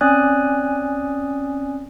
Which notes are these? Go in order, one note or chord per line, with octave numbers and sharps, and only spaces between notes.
C4 C#4 D5 G#5 D#6 F#6